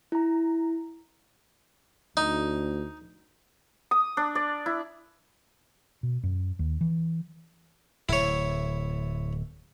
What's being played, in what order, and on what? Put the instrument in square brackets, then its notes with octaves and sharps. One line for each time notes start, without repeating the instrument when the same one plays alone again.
[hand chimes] E4 A#5
[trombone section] D2 [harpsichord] D#4
[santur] D#6
D4
D5
E4
[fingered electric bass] B2
F#2
D#2
E3
[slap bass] D1 [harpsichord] E4 C#5